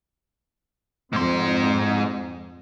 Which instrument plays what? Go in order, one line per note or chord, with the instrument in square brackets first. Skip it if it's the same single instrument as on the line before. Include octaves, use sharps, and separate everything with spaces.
[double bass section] F2 C4 [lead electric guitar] G#2 C6